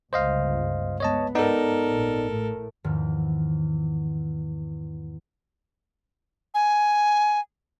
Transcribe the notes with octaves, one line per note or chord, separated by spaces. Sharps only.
G1 C#2 C5 D#5 F5
G#3 B3 C#5 D#5 A5
G#2 B3 D#4 A4 A#4 D5
A1 A#2
A2
E2 G#2 D#3 F3
G#5